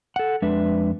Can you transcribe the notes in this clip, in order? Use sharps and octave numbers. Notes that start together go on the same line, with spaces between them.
A4 F#5
F2 G#3 D4 B4 E5